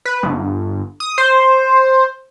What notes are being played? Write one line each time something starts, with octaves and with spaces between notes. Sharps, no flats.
B4
G1
D#6
C5